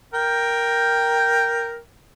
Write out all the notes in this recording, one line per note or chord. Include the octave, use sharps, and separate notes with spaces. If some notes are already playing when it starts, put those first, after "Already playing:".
A#4 G5